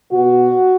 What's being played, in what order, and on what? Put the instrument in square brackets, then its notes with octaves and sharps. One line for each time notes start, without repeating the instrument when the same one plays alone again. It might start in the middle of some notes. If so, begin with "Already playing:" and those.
[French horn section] B2 F#4